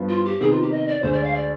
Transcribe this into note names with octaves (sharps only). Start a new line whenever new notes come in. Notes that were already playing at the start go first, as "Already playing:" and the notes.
Already playing: G2 F3 B3
F4
G4
C3 D#3 B3 G#4
F4
G4
D#5
D5
D2 D3 G#3 C5
D5
F5
D5